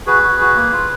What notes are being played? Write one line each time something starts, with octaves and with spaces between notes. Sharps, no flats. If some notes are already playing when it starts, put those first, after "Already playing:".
F#4 G#4 B4
F#4
F#4
A#3
F4